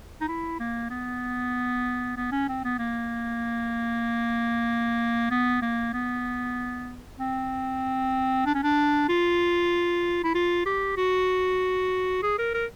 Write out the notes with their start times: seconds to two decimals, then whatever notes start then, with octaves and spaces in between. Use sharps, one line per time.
0.21 D#4
0.28 E4
0.60 A#3
0.90 B3
2.17 B3
2.32 C#4
2.48 C4
2.64 B3
2.79 A#3
5.31 B3
5.62 A#3
5.93 B3
7.19 C4
8.46 D4
8.54 C#4
8.63 D4
9.09 F4
10.24 E4
10.35 F4
10.66 G4
10.97 F#4
12.23 G#4
12.38 A#4
12.54 A#4